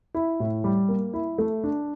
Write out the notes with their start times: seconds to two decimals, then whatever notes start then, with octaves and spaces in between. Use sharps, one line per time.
0.14 E4
0.40 A2
0.64 G3
0.89 A#3
1.13 E4
1.38 A3
1.64 D4